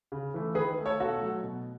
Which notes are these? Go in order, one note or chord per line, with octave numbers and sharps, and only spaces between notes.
C#3
E3 A3
D#3 G#4 B4
A3
A4 C#5
B2 F#4 A4
F#3 A3
B2